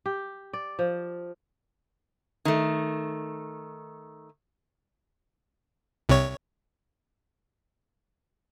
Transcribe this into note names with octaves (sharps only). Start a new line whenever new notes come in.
G4
D5
F3
D#3 A3
C2 C3 C#5